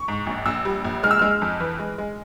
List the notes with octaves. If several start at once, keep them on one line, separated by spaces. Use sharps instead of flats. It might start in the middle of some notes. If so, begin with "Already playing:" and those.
Already playing: C#6
G#2
A#1
A#1 E6
G3
A#1
G#3 F6
E6
G#3 F6
F2
E3
G#3
G#3